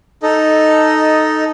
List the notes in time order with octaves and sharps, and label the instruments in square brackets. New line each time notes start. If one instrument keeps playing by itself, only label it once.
[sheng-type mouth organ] D#4 A4 D#5